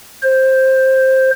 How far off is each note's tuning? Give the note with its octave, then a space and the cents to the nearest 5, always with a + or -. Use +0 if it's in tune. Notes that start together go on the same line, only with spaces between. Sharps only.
C5 +10